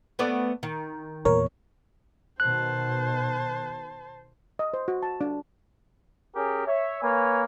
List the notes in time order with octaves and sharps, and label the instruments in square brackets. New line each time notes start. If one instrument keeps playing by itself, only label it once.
[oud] A3 B3 D5
D#3
[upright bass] E2 A#2 [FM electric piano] A#4 [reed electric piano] C#5
[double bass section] B2 D#3 [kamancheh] C5 A5 [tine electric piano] F#6
[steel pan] D#5
C5
F#4
A5
D4
[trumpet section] C#4 G4 G#4 A#4
C#5 E5
A#3 B4 C#5 G#5